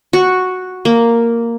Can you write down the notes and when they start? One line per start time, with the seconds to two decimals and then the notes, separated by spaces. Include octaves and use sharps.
0.13 F#4
0.85 A#3